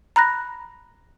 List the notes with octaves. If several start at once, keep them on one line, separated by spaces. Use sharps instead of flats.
A#5 B5 F#6 A#6